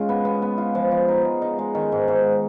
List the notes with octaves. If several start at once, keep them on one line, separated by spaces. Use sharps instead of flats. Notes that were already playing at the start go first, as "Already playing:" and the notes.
Already playing: G#3 C#4 F4
B3
B3
B3
F4
F3
F3
D#4
G#3
D#4
G#3
D#3
G#2
G#2